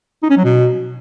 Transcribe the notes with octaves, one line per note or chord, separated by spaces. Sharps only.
D#4
C#4
F#3
B2